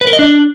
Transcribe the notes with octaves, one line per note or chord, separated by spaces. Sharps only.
B4
A#4
D#5
D4